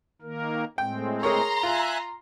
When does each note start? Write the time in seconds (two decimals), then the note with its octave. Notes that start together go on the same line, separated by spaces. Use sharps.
0.22 D#3 A#3 A#4
0.78 A2 G#3 C4 G5
1.23 G#4 A#4 C#5 A#5 C6
1.63 F4 E5 G#5 F#6